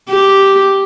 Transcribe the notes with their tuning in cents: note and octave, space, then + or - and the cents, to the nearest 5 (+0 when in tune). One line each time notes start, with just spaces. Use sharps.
G4 -5